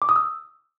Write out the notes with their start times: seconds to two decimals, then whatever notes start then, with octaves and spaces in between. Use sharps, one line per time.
0.02 D6
0.09 D#6
0.16 E6